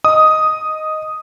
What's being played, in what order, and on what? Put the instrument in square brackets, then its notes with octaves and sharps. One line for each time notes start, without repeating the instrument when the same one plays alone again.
[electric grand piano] D#5 D#6